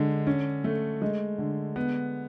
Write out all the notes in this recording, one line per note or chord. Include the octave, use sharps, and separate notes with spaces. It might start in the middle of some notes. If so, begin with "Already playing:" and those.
Already playing: D3 G#3
C#4
A3
G#3
D3
B3